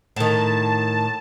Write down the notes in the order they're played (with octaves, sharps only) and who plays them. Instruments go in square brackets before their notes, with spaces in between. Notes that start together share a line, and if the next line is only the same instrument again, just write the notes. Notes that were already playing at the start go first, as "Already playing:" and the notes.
[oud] A2 D#3 [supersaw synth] A5